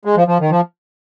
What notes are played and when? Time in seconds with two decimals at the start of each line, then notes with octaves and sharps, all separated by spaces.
0.05 G#3
0.17 F3
0.28 F3
0.40 D#3
0.51 F3